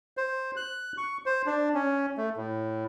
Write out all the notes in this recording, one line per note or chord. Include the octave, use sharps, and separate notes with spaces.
C5
F#6
C#6
C5
D4
C#4
A3
A2